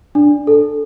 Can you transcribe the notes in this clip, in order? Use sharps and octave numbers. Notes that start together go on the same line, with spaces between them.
D4
A4